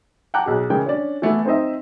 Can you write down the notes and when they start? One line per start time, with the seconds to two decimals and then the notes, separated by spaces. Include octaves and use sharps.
0.34 F#5 G5 A5 A#5 D6 F#6
0.46 B1 G#4
0.70 C#3 E3 G#3 A#4 G5
0.86 C#4 D4 D5
1.22 E3 A3 B3 E4
1.45 C4 D#4 C5 D#5 E5